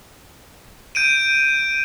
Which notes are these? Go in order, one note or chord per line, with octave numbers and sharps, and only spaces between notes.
G6 D7 D#7